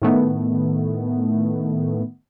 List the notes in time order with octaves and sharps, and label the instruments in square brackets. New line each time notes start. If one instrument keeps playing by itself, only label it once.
[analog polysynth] A2 D#3 A3 B3